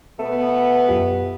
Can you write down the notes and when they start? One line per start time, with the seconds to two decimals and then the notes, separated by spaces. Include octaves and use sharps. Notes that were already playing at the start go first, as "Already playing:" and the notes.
0.19 B2 A3 B3
0.89 F#2 F4 G4